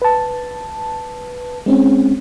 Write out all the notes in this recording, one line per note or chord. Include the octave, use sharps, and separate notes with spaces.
B4 A5
G#3 C4 C#4